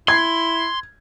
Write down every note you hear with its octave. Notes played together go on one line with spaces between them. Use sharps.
E4 C6 G#6